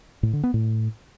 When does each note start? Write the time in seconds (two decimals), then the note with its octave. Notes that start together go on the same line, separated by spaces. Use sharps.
0.23 A2
0.33 D3
0.43 B3
0.54 A2